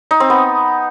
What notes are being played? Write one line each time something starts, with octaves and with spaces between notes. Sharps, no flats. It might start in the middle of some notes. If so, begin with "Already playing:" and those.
D#4
C4
B3